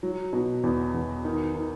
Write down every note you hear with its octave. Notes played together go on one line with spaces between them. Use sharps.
F#3
B2
E2
E2
D#3
D#3